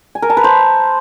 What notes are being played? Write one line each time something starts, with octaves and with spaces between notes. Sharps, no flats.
G#5
A#4
A5
B4
C5